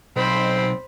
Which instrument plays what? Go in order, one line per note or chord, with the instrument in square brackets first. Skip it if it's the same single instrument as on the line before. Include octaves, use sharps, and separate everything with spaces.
[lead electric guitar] B1 [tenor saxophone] C4 [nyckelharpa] C5 B5